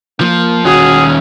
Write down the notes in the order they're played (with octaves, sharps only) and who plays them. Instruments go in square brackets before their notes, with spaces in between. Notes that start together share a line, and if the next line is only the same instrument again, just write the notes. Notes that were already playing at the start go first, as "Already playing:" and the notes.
[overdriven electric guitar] F3 [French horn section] A#3
[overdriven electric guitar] D#2 C#4 [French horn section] F#4 [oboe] G#4